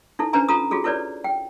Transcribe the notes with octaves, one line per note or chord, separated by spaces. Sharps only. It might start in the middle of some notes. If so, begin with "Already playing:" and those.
D#4 E4 A4
C#4 D4 B4 C5 G#5 A#5
F4 A4 A#5 D#6
F4 F#4 G#4 A4
E4 A4 B4 C#5 D5
G5